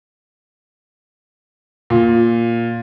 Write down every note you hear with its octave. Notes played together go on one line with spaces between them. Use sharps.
A#2